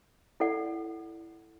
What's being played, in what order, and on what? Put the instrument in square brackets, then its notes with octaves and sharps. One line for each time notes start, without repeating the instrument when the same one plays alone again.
[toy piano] E4 A4 D5 F#5